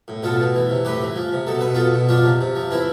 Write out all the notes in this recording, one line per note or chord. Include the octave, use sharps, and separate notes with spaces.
A2
B2 F4 A4
B2
E3
C3
A2 G4 B4
E3
F3
C3
B2 A4
B2 B4
B2 F4 A4
B2
F3 D4 F4
C3
C3
F3
E3 C4 E4